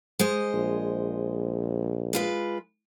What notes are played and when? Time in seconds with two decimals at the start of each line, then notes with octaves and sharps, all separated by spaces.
0.19 G#3 C5 D#5
0.54 A#1
2.13 G#3 F4 B4